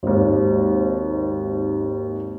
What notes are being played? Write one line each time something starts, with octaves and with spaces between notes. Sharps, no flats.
G#1 D#2